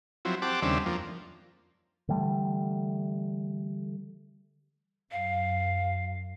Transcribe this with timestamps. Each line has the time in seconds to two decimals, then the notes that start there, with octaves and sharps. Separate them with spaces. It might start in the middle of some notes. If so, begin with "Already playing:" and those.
0.25 F3 F#3 C4 E4
0.42 C4 G4 F#5 A5 D6
0.62 D#2 C#3 G3 C4 D4 E5
0.86 F2 F3 A#3
2.09 D3 E3 G3 A3
5.12 F#2 F5